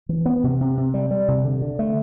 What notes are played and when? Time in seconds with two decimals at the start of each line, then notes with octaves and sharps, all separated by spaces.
0.09 E3
0.26 B3
0.44 C3
0.61 C3
0.77 C3
0.94 G3
1.11 G3
1.28 C3
1.45 D3
1.62 D3
1.79 A3